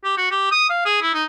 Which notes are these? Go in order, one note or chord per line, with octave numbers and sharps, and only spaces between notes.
G4
F#4
G4
D#6
F5
G#4
E4
D#4